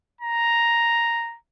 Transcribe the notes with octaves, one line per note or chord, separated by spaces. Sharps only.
A#5